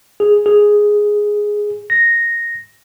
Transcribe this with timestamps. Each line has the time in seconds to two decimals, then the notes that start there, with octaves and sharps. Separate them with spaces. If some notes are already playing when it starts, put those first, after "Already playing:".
0.20 G#4
0.46 G#4
1.90 A#6